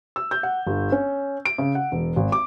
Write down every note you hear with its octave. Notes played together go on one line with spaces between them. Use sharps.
E6
G6
F#5
G1
C#4
D7
C#3
F#5
E1
G#1
D6